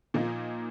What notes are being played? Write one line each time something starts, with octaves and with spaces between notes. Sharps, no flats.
A#2 F3 A#3 D#4